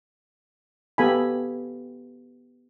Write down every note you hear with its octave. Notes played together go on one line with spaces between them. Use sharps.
B3 G4 A4 F5 G#5 B5